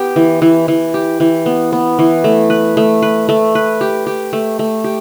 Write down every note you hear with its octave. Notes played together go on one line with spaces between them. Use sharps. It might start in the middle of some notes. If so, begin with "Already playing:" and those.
Already playing: B3 G4
E3
E3
E3
G4
E3
B3
B3
E3
A3
B4
A3
B4
A3
B4
G4
G4
A3
A3
G4